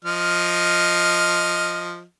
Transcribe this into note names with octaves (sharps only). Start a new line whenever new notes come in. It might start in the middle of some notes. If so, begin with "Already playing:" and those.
F3 D#5 F6